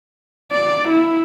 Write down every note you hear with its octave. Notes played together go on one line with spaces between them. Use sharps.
D5
E4